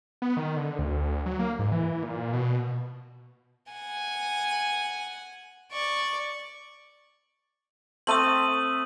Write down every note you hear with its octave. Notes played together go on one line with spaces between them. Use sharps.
B3
D#3
D3
D2
F#3
A#3
G#2
E3
A#2
B2
F#5 G#5
D5 C#6
A3 C4 D#6 D#7 F#7